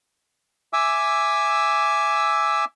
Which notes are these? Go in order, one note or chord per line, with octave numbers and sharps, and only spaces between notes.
E5 G#5 D6 E6